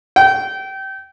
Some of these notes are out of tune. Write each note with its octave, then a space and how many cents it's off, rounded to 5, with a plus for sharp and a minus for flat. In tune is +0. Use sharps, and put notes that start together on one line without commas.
G5 -25